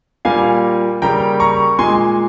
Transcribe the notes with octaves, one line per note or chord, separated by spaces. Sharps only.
A#2 G3 A#3 F5 G#5
C#3 G3 A#3 G5 A#5
A#5 C#6
A#2 G#3 G#5 C6